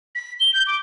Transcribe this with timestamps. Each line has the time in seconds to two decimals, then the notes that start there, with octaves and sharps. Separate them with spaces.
0.15 B6
0.40 G7
0.53 G6
0.66 D6